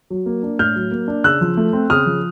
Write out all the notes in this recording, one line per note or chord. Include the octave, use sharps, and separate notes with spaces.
F#3
A#3
D4
A2 F6 G6
F#3
A#3
D4
C#3 E6 F#6
F3
A3
C4
C#3 D#6 F6
F3